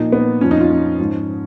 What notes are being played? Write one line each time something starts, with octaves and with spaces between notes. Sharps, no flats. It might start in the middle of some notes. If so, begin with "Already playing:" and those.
Already playing: A#2 F3 D#4
B3
F2 F3 C#4
D#4
F4
C#4
G#2 F3